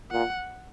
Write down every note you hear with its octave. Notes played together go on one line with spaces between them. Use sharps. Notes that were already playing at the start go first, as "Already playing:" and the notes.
A#2 F#5